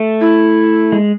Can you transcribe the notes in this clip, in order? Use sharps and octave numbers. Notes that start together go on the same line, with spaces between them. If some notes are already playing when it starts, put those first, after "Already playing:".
Already playing: A3
E4
G#3